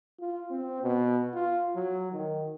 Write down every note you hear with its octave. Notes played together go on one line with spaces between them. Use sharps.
F4
C4
B2
F4
F#3
D#3